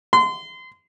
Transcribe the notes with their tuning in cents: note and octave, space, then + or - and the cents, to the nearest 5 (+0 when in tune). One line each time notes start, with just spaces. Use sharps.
C6 -30